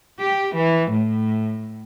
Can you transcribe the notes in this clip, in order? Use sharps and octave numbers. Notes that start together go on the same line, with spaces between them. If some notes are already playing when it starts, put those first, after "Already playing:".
G4
E3
A2